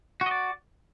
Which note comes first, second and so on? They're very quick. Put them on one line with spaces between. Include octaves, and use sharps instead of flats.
F#4 D#5 D5